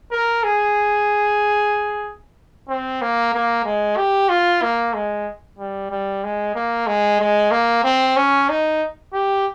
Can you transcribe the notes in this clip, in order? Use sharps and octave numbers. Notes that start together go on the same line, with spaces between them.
A#4
G#4
C4
A#3
A#3
G#3
G4
F4
A#3
G#3
G3
G3
G#3
A#3
G#3
G#3
A#3
C4
C#4
D#4
G4